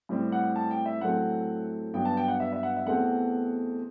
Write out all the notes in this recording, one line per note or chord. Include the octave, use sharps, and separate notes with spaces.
A2 G3 C4
F#5
A5
G5
E5
A2 F#3 A3 C4 F#5
G2 F#3 B3 G5
A5
G5
F#5
E5
E5
F#5
E5
E2 B2 A3 C4 F#5